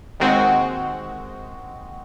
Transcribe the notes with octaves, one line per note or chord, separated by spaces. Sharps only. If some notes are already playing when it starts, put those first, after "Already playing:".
D#2 D#3 G#3 C4 F#4